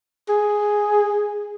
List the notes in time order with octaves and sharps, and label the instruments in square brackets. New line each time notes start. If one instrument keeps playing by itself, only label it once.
[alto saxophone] G#4